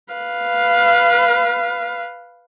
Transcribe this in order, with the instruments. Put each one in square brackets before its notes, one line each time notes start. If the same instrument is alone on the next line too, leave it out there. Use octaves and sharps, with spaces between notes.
[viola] B4 F5